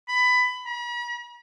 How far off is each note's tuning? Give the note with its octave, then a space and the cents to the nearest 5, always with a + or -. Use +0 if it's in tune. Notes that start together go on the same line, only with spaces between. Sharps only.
B5 +15
B5 -45